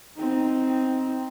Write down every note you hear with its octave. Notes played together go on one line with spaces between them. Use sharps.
C4 D#4